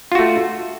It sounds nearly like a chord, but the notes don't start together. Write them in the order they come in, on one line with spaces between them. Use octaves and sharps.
F4 F#4 A3